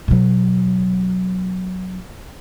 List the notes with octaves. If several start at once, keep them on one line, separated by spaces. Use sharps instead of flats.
B2 F#3